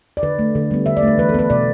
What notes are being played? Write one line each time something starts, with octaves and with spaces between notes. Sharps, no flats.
D5
D3 B4
A3
D3
G3 B3
D3 E5
D5
A3 B4
E3 B4
A4
B3 B4
B2 D5